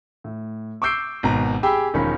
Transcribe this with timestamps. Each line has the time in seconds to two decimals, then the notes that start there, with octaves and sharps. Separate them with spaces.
0.24 A2
0.82 C#6 D6 E6 G6 C7 D7
1.23 G#1 B2 A#5
1.63 G4 G#4 G5 B5 E6
1.94 E1 D#3 F3 C#4 D#4 B5